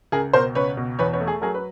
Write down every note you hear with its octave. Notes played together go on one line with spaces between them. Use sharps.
C#2 G#4 A#4
B2 A#4 C5
C#2 B4 C#5
B2
E2 B4 C#5
B4 C#5
A3
G#4
F#3 G#4 A#4
B4